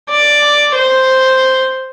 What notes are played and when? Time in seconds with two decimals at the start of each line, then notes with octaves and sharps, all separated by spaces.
0.10 D5
0.75 C5